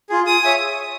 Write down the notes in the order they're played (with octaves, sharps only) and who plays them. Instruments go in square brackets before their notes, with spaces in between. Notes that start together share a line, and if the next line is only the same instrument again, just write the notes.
[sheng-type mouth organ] F4 G#4
[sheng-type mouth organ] G#4 [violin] D#6
[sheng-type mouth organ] C#5 E5 G#5